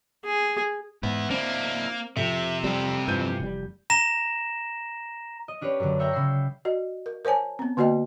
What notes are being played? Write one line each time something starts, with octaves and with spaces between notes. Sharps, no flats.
G#4
G#2 B3 E4
A#3 C4 D4 E4
F2 C3 E5
G3 C4 A4
G2 E3 F3 G6 D#7
F1 G3
A#5 A#6 E7
D#5
C#4 D4 G4 B4 C#5
F#2 D3
A#4 C#5 E5 F#5 G5 A#5
C#3 B5 E6 C7 C#7
F#4 D5 D#5
A#4
A#4 C5 C#5 G#5 A5
B3 C4
D3 A#3 F#4 D5 D#5 G5